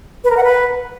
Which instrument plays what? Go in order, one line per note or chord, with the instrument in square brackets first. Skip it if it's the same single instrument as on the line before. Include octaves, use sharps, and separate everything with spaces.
[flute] B4
A#4
F#5
B4